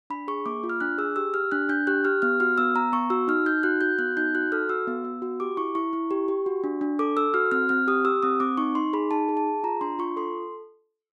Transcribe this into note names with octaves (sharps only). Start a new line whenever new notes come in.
D4 B5
G#4 C#6
A#3 D6
F4
F6
D4 F#6
G#4 E6
G4 E6
G4 F6
D4 F#6
D4 G6
G4 F#6
G4 F6
B3 F6
F#4 F6
B3 E6
B3 A#5
B3 C#6
F#4 E6
D#4 F6
D#4 G6
F#4 F#6
F#4 G6
B3 F#6
D#4 G6
F#4 F#6
A4 F6
F#4 E6
B3
B3
F#4
G4 D6
E4 C#6
E4 C#6
E4
G4
G4
F#4
D4
D4
A4 D6
A4 E6
F#4 F6
C4 F6
C4 F6
G4 D#6
G4 E6
C4 D#6
C4 D6
D#4 C#6
D#4 C6
G#4 B5
D#4 A5
G#4
A5
G#4
F4 A#5
D4 C6
F4 C#6
A4 C6